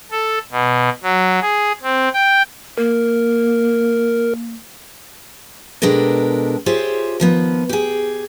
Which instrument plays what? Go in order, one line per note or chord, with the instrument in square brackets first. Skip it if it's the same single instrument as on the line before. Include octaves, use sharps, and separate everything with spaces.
[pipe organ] A4
B2
F#3
G#4
C4
G5
[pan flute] A#3 [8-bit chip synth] A#4
[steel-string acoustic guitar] B2 G#3 D4 G4 A4 A#4
F4 G4 G#4 C5 C#5 E5
D#3 F3 B3
G4 G#4